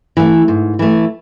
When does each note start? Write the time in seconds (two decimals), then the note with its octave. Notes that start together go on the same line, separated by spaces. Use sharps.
0.17 E3 A3
0.48 G#2
0.79 E3 A3